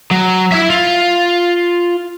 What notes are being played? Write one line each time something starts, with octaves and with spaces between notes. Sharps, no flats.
F#3
E4 E5
F4